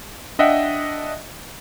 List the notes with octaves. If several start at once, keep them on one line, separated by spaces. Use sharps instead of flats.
D4 D#5 E5 F#5 G5